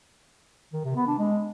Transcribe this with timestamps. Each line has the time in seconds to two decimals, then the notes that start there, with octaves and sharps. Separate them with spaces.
0.73 D#3
0.84 C3
0.96 B3
1.07 D4
1.18 G#3